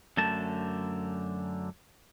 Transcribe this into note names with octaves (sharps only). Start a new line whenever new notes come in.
F#2 D3 A3 A5